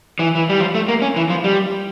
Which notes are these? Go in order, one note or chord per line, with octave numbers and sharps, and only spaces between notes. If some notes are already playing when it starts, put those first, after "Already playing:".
E3
E3
G3
F3
A3
A#3
C#4
E3
F3
G3